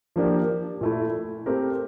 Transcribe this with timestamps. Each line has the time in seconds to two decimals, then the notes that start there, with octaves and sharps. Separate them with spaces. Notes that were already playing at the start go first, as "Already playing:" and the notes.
0.16 F3 A#3 D4 G4 A#4
0.81 A#2 A3 E4
1.46 A3 C4 G4 A#4